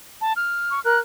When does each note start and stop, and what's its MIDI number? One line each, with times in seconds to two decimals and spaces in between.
0.21 0.33 81
0.36 0.81 89
0.71 0.80 85
0.84 0.97 70
0.84 0.99 90